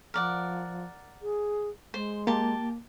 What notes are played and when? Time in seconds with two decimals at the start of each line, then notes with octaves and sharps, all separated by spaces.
0.14 F3 A#4 D5 F#5
1.22 G#4
1.94 G#3 C5
2.27 A#3 G4 A5